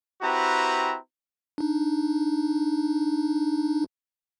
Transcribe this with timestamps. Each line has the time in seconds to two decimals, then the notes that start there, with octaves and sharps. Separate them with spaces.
0.22 C4 E4 F#4 G4 B4 A#5
1.58 D4 D#4